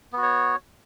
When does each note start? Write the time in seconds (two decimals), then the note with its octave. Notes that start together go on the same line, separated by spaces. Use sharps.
0.13 B3
0.18 F#4
0.22 C#5